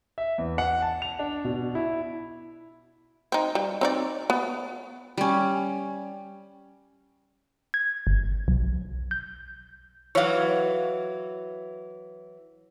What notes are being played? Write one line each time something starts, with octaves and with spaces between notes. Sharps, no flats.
E5
E2
F#5
A5
F7
D4
B2
E4
C4 D#4
G3
C4 D#4 D5
B3
G3 C#4
G#6
G1
B1
G6
E3 F#3 C#5 F5